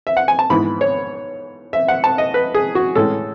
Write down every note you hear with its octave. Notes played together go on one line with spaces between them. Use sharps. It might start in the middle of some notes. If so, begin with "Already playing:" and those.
E5
F#5
G#5
A5
G#2 E3 B3 B5
C#5
E5
F#5
A5
D#5
B4
G#4
F#4
A2 E3 G#3 C#4 A4